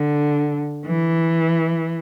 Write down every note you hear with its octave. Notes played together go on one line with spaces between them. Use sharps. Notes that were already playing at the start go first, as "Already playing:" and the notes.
Already playing: D3
E3